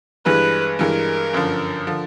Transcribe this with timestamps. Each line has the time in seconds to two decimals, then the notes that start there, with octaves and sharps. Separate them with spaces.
0.25 G2 E3 G#3 B4
0.79 G2 E3 G#3 A#4
1.33 G1 F#2 D3 F3
1.87 D3 F3